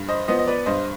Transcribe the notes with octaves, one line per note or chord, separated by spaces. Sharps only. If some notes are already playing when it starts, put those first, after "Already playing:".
Already playing: G2
C5 D#5
F3 B3 C5 D#5
D#5
B4 D5
G2 C5 D#5